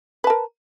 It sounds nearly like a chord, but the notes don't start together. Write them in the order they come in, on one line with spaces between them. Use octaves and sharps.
B4 A5 A#4